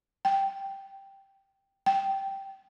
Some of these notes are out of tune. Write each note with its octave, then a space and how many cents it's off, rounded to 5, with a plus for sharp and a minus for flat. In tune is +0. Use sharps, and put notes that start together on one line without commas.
G5 +0
G5 -5